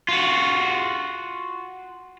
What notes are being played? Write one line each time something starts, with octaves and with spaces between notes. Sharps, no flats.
F4 F#4